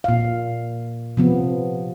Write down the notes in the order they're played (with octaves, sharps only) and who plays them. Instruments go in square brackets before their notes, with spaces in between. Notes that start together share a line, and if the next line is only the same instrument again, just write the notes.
[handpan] A#2 F5
C3 F3 B3